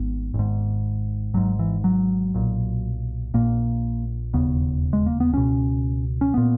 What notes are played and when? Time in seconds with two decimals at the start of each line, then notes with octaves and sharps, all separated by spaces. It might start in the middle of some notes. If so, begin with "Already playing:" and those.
Already playing: G#1 G#2 B3
0.34 G#1 G#2
1.34 G#1 G#2 F#3
1.59 E3
1.84 F#3
2.34 B1 A#2
3.34 A#1 A#2 A#3
4.34 E1 D#2 C#3 B3
4.93 G#3
5.06 A#3
5.20 B3
5.33 C#2 B2 C#4
6.21 C#4
6.34 A#2 B3